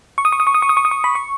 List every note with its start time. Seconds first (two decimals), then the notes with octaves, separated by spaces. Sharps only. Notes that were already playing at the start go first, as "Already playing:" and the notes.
0.18 C#6
0.25 D#6
0.32 C#6
0.40 D#6
0.47 C#6
0.55 D#6
0.62 C#6
0.69 D#6
0.77 C#6
0.85 D#6
0.91 C#6
1.04 B5
1.15 C#6